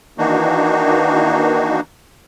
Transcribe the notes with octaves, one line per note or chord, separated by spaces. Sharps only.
D#3 E3 A#3 D4 D#4 F#4